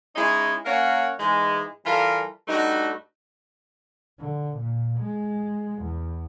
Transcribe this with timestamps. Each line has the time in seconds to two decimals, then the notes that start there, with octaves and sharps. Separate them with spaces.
0.16 G#3 C#4 D#4 E4 G#4
0.66 A#3 C#4 A#4 C#5 F#5
1.19 G#2 E3 G#3
1.85 E3 G3 F4 A4 A#4
2.48 G2 G3 A3 D#4 F#4
4.19 D3
4.57 A#2
4.99 G#3
5.82 E2